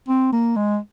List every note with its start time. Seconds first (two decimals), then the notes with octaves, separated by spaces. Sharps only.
0.08 C4
0.32 A#3
0.56 G#3